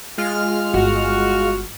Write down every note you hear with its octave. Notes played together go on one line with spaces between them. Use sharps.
G#3 F4 F6
G1 F#4